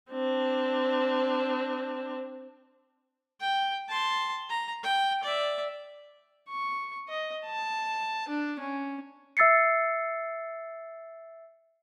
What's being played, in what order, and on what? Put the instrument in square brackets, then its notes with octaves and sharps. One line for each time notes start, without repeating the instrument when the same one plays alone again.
[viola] C4 D4
[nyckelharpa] G5
A5 C6
A#5
G5
D5 E5
C#6
D#5
A5
D4
C#4
[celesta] E5 E6 A6 C7 C#7